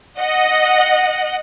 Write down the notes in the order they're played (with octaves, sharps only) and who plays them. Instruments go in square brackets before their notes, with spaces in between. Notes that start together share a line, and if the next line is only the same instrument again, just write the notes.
[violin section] D#5 F#5